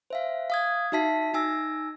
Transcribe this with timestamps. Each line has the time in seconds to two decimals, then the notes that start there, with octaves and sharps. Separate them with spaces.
0.10 C5 E5 F5
0.50 F5 D#6 G#6
0.92 D#4 F#4 E5 A5 B6
1.34 D#4 G#5 E6 A#6